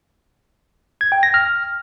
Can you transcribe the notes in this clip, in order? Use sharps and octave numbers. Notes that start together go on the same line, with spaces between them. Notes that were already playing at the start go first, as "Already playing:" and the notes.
G#6
G5
A#6
F6